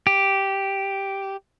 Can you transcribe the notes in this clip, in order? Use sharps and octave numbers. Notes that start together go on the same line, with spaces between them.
G4